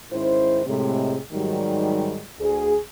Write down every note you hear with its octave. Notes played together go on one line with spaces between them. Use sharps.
G#2 D#3 C#4 E4 C5
A2 C3 G#3
G#2 D#3 F#3 G3
D2 G#4